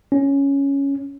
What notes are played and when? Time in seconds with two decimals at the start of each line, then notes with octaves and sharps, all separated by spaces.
0.12 C#4